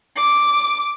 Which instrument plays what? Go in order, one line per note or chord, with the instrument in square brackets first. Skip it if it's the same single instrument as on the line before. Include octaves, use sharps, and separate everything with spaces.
[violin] D6